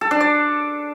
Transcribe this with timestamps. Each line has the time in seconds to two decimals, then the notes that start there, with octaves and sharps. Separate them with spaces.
0.01 A4
0.11 D4
0.20 D5